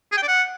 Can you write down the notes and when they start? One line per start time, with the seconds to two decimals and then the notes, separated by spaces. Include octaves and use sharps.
0.12 G#4
0.17 G5
0.23 D5
0.28 F#5